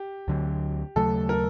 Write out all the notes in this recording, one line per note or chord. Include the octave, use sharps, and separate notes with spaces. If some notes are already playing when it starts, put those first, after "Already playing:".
Already playing: G4
D2 D3 F#3
D#2 C#3 F#3 A3 A4
A#4